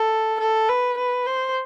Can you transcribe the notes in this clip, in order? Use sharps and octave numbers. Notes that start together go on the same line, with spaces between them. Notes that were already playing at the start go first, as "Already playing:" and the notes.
Already playing: A4
A4
B4
B4
C5